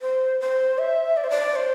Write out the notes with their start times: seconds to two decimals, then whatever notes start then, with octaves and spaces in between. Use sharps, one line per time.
0.02 C5
0.40 C5
0.78 E5
1.17 D5
1.24 C5
1.30 D5
1.56 C5